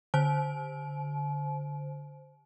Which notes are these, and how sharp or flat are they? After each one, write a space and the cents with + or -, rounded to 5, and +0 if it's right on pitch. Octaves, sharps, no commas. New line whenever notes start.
D3 -15 C5 -5 A5 -45